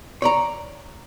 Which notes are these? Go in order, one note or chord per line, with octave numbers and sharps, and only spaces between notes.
C#5 D5 A#5